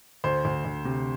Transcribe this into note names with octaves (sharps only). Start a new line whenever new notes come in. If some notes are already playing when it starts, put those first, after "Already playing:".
D2 C5
D2
D2
C3